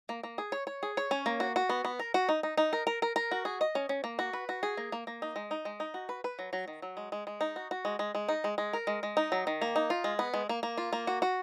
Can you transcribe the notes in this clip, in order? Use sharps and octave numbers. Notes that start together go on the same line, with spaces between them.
A#3
A#3
G#4
C#5
C#5
G#4
C#5
C#4
A#3
F#4
F#4
B3
B3
A#4
F#4
D#4
D#4
D#4
A#4
A#4
A#4
A#4
F#4
G#4
D#5
C#4
C#4
A#3
F#4
B4
F#4
G#4
A#3
A#3
A#3
D#4
G#3
D#4
G#3
D#4
F#4
B4
B4
F#3
F#3
D#3
F#3
G#3
G#3
G#3
D#4
F#4
F#4
G#3
G#3
G#3
D#4
G#3
G#3
A#4
G#3
G#3
D#4
F#3
D#3
A#3
D#4
F4
G#3
B3
G#3
A#3
A#3
F4
A#3
F#4
F#4